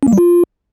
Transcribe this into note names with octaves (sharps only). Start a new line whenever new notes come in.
C#4
A#3
G3
F4